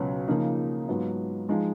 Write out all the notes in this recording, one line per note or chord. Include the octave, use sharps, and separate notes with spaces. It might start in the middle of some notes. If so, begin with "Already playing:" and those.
Already playing: C#2 B2 F#3 C#4
C#3 F3 A#3 D#4
G#2 F#3 B3 F4
F3 G#3 D#4